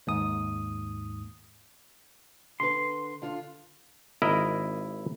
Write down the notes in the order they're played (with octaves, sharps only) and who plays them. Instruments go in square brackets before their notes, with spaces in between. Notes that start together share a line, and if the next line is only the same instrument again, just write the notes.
[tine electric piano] D#2 G#2 D#6
[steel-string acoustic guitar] D3 B4 [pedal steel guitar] C6
[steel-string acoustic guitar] D3 F4
[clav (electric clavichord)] G#1 E4 A#4 D#5